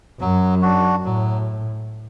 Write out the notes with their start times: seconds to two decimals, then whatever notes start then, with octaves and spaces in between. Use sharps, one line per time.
0.20 F#2 F#3
0.62 D4 F#4
1.04 A2 F#3